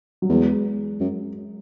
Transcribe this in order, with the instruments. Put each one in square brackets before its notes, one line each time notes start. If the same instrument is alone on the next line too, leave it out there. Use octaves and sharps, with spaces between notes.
[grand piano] F#3
[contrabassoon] E2 [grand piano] G#3
[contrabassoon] F#2